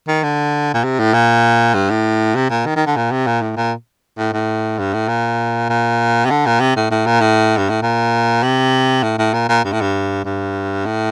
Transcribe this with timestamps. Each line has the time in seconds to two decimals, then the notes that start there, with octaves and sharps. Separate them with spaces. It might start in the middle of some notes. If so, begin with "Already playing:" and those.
0.08 D#3
0.23 D3
0.74 A#2
0.84 C3
0.99 A2
1.14 A#2
1.74 G2
1.90 A2
2.36 C3
2.50 A#2
2.66 D#3
2.76 D#3
2.86 D3
2.96 A#2
3.11 C3
3.27 A#2
3.42 A2
3.57 A#2
4.18 A2
4.33 A2
4.79 G2
4.94 A2
5.09 A#2
5.69 A#2
6.25 C3
6.30 D3
6.46 A#2
6.60 C3
6.76 A2
6.91 A2
7.06 A#2
7.21 A2
7.57 G2
7.70 A2
7.82 A#2
8.43 C3
9.03 A2
9.19 A2
9.34 A#2
9.49 A#2
9.64 G2
9.72 A2
9.81 G2
10.25 G2
10.86 A2